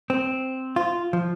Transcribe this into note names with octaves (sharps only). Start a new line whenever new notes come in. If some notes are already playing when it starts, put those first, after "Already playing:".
C4
F4
F3